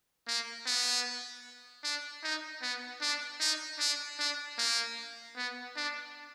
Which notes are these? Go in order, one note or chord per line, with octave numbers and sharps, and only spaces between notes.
A#3
B3
D4
D#4
B3
D4
D#4
D4
D4
A#3
B3
D4